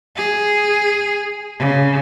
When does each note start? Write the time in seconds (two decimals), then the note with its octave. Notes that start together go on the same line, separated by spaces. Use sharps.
0.16 G#4
1.59 C#3